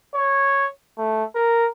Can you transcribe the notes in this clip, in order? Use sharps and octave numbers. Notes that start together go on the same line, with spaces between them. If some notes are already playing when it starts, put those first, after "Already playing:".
C#5
A3
A#4